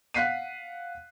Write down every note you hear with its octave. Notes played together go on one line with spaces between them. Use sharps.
F5 F#5 F#6 B6 C7 D#7